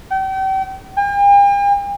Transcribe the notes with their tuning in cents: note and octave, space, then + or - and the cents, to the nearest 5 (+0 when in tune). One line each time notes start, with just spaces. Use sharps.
G5 -35
G5 +45